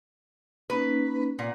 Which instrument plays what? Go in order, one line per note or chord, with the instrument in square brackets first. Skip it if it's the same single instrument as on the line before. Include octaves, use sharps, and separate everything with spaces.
[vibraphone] A#3 C#4 D#4 [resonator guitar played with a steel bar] B4
[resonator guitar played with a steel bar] A#2 [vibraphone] F#5